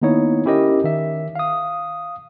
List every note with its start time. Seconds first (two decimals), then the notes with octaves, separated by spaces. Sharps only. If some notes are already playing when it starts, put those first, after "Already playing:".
0.02 D#3 A#3 B3 D#4 E4 C#5
0.45 C#4 E4 G4 A#4 D#5
0.84 D#3 E5
1.35 F5 D#6